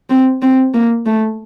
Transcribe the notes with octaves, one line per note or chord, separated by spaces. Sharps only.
C4
C4
A#3
A3